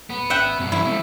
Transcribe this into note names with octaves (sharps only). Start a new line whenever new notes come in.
D#1 B3
G#1 E5 F#5 G5
C2 G2 B2
E3 E4
F3 G#3 A3 B3